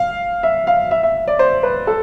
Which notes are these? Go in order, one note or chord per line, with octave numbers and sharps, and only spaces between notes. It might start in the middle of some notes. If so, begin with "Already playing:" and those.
Already playing: F5
E5
F5
E5
E5
D5
C5
B4
A4